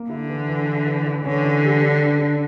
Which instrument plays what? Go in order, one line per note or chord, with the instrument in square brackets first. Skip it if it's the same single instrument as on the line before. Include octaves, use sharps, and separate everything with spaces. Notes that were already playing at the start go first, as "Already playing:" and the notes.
Already playing: [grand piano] A#3
[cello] D3 [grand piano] E4
[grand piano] E3
E3
E3
E3
E3
[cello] D3 [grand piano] C#4
[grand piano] E3
G3
D4
D4
D4